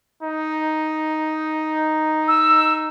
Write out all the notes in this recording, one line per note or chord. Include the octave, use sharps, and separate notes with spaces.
D#4
E6